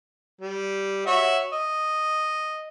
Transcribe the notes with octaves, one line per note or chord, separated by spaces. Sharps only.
G3
F#4 C#5 E5
D#5